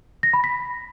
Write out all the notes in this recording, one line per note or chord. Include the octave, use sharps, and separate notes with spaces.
A#6
B5
B6